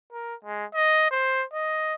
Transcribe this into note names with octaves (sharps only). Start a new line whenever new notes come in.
A#4
G#3
D#5
C5
D#5